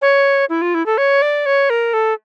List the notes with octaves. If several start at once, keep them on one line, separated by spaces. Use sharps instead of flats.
C#5
E4
F4
E4
A4
C#5
D5
C#5
A#4
A4